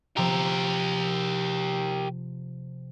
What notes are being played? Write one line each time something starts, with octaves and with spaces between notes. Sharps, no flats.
C3 F3 G4 A#4